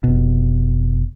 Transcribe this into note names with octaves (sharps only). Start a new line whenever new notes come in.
F1 B2